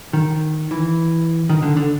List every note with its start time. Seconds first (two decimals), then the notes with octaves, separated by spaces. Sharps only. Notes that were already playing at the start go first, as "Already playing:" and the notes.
0.13 D#3
0.71 E3
1.50 D#3
1.62 D3
1.76 D3